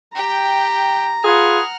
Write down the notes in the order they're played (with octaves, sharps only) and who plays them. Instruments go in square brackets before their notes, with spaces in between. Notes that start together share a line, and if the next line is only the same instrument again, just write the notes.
[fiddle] G4 G5 [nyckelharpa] A#5
[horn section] F4 G#4 B4 [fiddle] F#5 F6